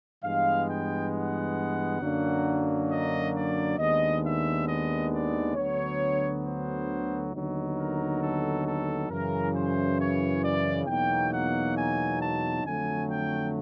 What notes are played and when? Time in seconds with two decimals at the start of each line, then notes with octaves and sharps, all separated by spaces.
0.24 G2 E3 G#3 B3 F5
0.68 G5
1.13 F#5
2.01 F#2 D3 F#3 A#3 D4
2.89 D#5
3.34 D5
3.79 D#2 D#3 G#3 B3 D4 D#5
4.23 E5
4.67 D#5
5.12 D5
5.55 D2 D3 F#3 B3 C#5
6.44 C5
7.33 D#2 D3 F#3 B3 D#4
7.77 A#4
8.21 A4
8.65 A4
9.10 F#2 C#3 E3 A#4
9.55 C5
9.98 C#5
10.42 D5
10.87 E2 B2 F#3 A#3 D#4 G5
11.31 F#5
11.76 G#5
12.20 A5
12.64 F2 D3 F#3 A3 G#5
13.09 G5